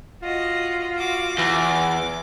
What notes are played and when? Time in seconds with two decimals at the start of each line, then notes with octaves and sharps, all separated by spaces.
0.22 F4 F#4 D#5
0.95 F#4 D6
1.39 E2 D6